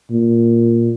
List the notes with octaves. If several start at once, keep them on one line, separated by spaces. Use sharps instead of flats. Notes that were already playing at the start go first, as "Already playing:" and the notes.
A#2